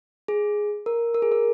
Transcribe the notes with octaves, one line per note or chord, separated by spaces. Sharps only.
G#4
A#4
A#4
G#4
A#4